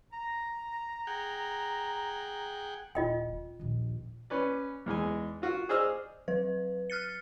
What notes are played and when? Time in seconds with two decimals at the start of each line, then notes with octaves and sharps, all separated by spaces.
0.13 A#5
1.07 G#4 F#5 G5
2.95 D#1 F4 D#5 G5
3.28 C4
3.59 A#1 D#2
4.30 C#4 B4 D5
4.86 E2 G#3 D#4 G#5
5.42 F4 F#4 F5
5.69 G#4 C5 D5 D#5 E6 F6
6.28 F#3 B4
6.90 F6 F#6 A6 C#7